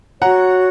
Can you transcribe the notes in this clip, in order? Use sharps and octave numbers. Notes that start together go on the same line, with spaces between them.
F#4 C#5 F#5 A#5